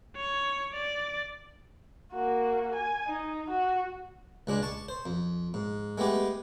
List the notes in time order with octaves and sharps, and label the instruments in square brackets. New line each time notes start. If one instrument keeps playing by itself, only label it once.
[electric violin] C#5
D5
[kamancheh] A#3 F#4
G#5
D#4
F#4
[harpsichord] C#2 G#3 D4
A5 C#6
C5
F2
G#2
G#3 A3 B3 G4